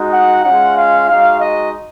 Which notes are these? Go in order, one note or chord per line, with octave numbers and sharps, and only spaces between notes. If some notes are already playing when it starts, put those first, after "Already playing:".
Already playing: G#3 D#4 F#4
F#5
G#3 C#4 F4 F#5
F5
G#3 D#4 F#4 F5
D#5